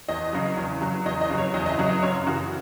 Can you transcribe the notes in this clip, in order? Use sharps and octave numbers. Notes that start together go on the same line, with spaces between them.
E2 D#5
C#3 F#3
E2
C#3 F#3
E2 D#5
D#5
C#3 F#3
C#5
E2 D#5
D#5
E5
C#3 F#3
D#5
F#2 C#5
C#3 E3 F#4